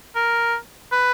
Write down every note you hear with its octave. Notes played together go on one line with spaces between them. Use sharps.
A#4
B4